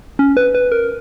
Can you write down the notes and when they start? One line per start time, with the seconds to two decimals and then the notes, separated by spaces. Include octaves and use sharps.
0.19 C#4
0.37 B4
0.55 B4
0.72 A#4